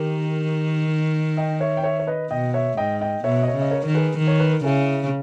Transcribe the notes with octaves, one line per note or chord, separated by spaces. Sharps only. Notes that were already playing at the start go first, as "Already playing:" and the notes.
Already playing: D#3 G4 A#4
D#5 G5
C#5 E5
G5
C#5 E5
C#5
B4 D#5
B2 D#5 G5
C#5 E5
G#2 D#5 G5
D#5 G5
B2 C#5 E5
D#5
C#5 E5
C#3
D#5
A#4 C#5
D#3 C#5
G#4 B4
D#3
C#5
B4
A#4
C#3 E4 G#4